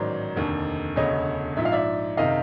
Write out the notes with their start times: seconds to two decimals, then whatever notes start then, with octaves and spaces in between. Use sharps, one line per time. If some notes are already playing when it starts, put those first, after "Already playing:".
Already playing: A1 G#2 D#3 F#3 C5 D5
0.36 F1 D#2 D3
0.96 E1 D2 C#3 C#5 D#5
1.57 A#1 G#2 F3 E5
1.65 F5
1.72 D5 E5
2.17 F#1 C3 D#3 D#5 F5